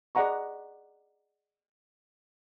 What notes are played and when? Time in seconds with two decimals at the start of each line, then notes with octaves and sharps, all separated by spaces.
0.15 G#4 D5 D#5 F#5 A#5 C#6